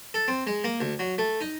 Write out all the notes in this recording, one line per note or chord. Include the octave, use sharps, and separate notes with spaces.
A4
C4
G#3
A#3
D2
F#3
A3
D#4